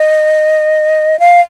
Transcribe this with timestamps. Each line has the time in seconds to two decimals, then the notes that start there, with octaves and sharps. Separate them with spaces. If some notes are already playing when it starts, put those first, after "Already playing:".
Already playing: D#5
1.19 F5